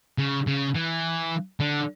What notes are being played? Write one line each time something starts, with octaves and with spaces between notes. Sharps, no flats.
C#3
C#3
E3
D3